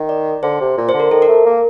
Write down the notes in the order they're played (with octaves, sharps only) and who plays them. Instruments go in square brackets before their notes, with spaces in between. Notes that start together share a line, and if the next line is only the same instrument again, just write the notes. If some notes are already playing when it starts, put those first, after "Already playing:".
Already playing: [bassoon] D#3
[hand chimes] D5
[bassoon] D3 [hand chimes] C5
[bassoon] C3
A#2
[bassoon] D3 [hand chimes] C5
[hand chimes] A#4
[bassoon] D#3 [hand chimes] A4
[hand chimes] A#4
[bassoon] A3
A#3